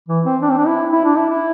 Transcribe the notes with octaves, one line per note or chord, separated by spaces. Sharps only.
E3
C4
D4
C4
D4
E4
E4
D4
E4
E4